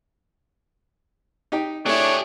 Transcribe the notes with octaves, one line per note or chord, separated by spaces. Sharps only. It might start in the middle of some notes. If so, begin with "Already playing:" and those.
D#4 G4 G5
A3 D4 E4 G4 G#4 C#5